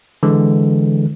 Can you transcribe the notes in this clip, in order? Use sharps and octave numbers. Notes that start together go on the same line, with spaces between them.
D3 E3 G#3